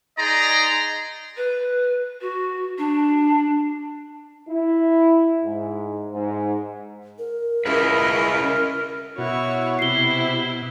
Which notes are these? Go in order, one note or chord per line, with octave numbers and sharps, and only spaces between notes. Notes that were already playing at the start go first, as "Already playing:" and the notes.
D#4 G#4 D5 D#5 A#5 C6
B4
F#4
D4
E4
G#2
G#2
A#4
C#4 E4 G#4 B4 D#5 F5
B2 E4 F#4 C#5
C3 E4 C7 G7